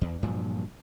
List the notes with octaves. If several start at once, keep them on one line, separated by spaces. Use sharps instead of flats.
E2
G2 A#2 F3 F#3